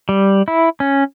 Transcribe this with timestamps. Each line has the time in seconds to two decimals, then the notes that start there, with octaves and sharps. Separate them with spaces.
0.09 G3
0.48 E4
0.80 C#4